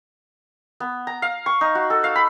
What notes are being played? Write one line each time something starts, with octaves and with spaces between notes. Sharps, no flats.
B3
A#5
F5
C#6
D#4
F#4
A4
F5
B5